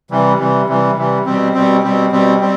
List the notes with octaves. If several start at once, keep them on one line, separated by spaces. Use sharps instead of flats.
C3 E3 G3
C3 E3 G3
C3 E3 G3
C3 E3 G3
B2 G3 C4
B2 G3 C4
B2 G3 C4
B2 G3 C4
G3 C4